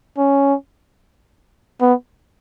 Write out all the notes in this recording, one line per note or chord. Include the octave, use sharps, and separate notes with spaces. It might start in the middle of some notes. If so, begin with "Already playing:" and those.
C#4
B3